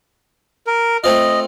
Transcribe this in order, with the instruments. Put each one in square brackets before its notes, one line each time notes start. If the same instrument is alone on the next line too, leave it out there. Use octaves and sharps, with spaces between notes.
[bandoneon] A#4
[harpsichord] A3 C4 F4 [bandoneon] D#5